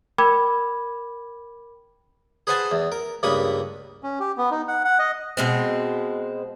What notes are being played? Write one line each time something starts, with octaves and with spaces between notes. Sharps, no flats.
A#4 G5 B5 D6 G#6
G#4 B4 C5 F#5 G#5 A5
E2
A#4
C#2 G2 A#3 B5 C#6 D#6
C#4
G4
B3
D#4
F#5
F#5
D#5
B2 G#3 C4